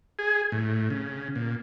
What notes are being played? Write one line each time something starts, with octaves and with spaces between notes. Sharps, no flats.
G#4
A2
C#3
A#2